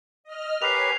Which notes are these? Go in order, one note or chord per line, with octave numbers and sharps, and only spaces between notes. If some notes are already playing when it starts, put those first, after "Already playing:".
D#5 F6
G4 A#4 B4 C#5 G#5 C7 F7